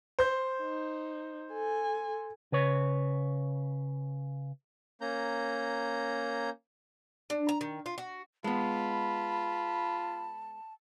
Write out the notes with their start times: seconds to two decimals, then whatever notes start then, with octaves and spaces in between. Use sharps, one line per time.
0.19 C5 G6
0.61 D#4
1.52 A4 G#5
2.52 C#3 B4 C#5
5.01 A#3 C#4 A#5 G6
7.30 D4
7.49 A#5
7.61 D#3
7.86 F4
7.98 F#4
8.44 G#3 B3 F4 A5 B5